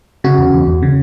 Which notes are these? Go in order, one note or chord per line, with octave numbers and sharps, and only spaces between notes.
C#3 F#4
E2
E2
E2
C#3